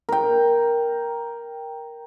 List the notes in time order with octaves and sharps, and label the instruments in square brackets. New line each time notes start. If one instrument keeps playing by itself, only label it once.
[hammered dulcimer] A#4 G5